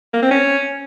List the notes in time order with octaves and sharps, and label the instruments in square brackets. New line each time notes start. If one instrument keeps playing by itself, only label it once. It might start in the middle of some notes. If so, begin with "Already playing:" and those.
[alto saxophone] A#3
C4
C#4